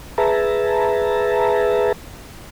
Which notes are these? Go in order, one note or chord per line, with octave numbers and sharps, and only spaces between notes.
G#4 B4 E5 A5 A#5